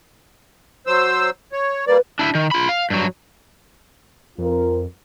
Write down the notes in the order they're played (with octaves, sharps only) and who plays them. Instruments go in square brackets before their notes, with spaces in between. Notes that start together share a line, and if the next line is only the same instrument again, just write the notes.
[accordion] F#3 C5 E6
C#5
[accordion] G3 A#3 D5 [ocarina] B4
[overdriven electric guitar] D4 E4
D#3
F4 B5
F5
G2 F#3
[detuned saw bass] F2 [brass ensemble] C4 F4 A#4